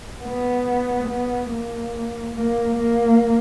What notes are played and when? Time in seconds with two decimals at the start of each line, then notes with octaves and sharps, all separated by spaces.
0.23 B3
1.08 B3
1.51 A#3
2.35 A#3
2.78 A#3